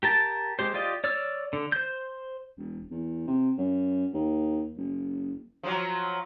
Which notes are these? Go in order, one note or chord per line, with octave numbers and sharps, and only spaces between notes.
G4 A#4 A5
G#3 G4 C5
F4 G4 D5 D#5
C#5 D5 E6 F6
D3
C5 G6
E1
E2
C3
F#2
D#2
F#1
F3 F#3